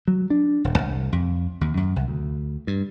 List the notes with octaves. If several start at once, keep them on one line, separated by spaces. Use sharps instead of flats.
F#3
D4
D#1
C2
F2
D#2
F#2
C2
D2
G2